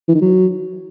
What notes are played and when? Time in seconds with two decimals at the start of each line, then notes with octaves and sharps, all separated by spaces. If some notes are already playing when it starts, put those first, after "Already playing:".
0.08 E3
0.15 D#3
0.21 F#3